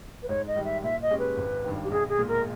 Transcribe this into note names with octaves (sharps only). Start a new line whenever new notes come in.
B4
G#2 C#5
D#5
D#3 G3
E5
A#2 E5
D#5
G#3 C#4 G4
B4
G#1
G2 D#3
G4
B1 G#4
G#4
A#2 G#3
A#4